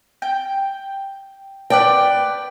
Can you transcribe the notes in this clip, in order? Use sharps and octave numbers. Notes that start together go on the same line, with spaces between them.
G5
B4 D5 G5 A5